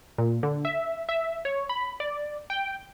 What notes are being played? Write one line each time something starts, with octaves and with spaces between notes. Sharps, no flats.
A#2
D3
E5
E5
C#5
B5
D5
G5